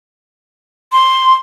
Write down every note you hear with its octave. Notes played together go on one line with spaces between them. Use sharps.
C6